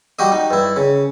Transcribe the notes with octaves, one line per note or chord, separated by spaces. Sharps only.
G3 F#4 G4 D#5
D#4
G2 E4
C#3